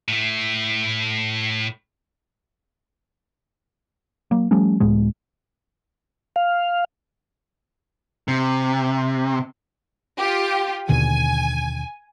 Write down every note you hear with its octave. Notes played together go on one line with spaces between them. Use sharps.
A2 A3
F#3 A#3
F3 G3 A3 C#4
C#2 A2 G#3
F5
C3
F4 G4
D#2 B2 D3 G#5